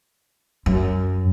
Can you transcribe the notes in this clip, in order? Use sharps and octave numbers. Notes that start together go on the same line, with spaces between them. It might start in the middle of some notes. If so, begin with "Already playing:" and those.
F#2